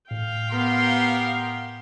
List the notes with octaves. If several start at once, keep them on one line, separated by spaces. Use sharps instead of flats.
A2 F5 G5
B3 G4 A#4 C6